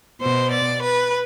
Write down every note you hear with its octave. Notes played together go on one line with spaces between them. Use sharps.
B2 C5
D5
B4